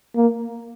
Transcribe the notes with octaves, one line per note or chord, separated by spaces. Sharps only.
A#3